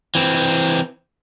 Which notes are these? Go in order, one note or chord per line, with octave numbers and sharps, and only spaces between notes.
E3 C4